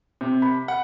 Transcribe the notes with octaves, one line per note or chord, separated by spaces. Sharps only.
C3
B5
F#5